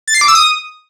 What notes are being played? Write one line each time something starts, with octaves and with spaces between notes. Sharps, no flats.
A6
C7
D6
E6
D#6